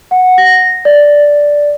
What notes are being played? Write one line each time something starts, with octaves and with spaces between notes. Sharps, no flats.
F#5
A#6
D5